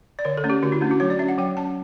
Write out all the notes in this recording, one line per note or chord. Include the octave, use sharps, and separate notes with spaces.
D5
D3 C#5
A4
A3 C#4
G4
D3 F#4
E4
A3 C#4 D4
F#4
F#3 C#5
D5
C#4 E5
F#5
F#3 G5
C#4 A5